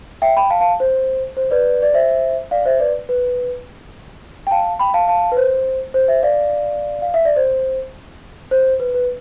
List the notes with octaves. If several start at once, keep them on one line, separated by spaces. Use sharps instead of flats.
E5 G5
G5 B5
F5 A5
F5 A5
C5
C5
B4 D5
D5
C5 E5
D5 F5
C5 E5
B4 D5
B4
G5
F5 A5
G5 B5
F5 A5
F5 A5
B4
C5
C5
C5 E5
D5 F5
F5
E5
D5
C5
C5
B4
B4